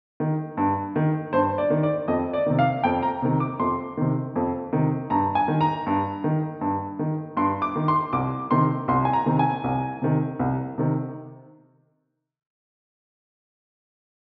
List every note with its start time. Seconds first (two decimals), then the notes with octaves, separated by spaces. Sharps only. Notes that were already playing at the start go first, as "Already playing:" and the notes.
0.20 D#3
0.57 G2
0.96 D#3
1.33 G2 C5
1.58 D5
1.70 D#3
1.83 D5
2.08 F2 D#5
2.33 D5
2.46 C3 D#3
2.59 F5
2.84 F2 G5
3.02 A#5
3.22 C3 D#3
3.40 D6
3.60 F2 C6
3.97 C3 D#3
4.36 F2
4.73 C3 D#3
5.10 G2 A#5
5.35 G#5
5.48 D#3
5.61 A#5
5.87 G2
6.24 D#3
6.61 G2
6.99 D#3
7.37 G2 C6
7.62 D6
7.76 D#3
7.88 C6
8.13 C2 D6
8.51 C3 D#3 C6
8.88 C2 C6
9.05 G#5
9.13 A#5
9.26 C3 D#3
9.39 G#5
9.64 C2
10.02 C3 D#3
10.39 C2
10.78 C3 D#3